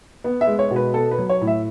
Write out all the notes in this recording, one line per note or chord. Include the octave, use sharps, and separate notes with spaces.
B3
E5
G#3
C#5
B2
B4
B3 A4
B4
F#3
C#5
A2
E5